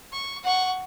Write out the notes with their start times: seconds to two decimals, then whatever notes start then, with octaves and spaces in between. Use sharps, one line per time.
0.12 C#6
0.43 F#5 C#6